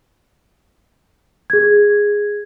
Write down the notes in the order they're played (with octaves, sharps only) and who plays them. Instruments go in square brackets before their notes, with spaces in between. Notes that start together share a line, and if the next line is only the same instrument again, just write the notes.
[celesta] G#4 G#6